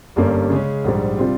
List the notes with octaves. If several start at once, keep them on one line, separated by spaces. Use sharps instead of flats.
G1 G2 G3 A#3 C#4
C#3 G#3 C#4
A#1 G#2 G3
C3 G3 C4 F4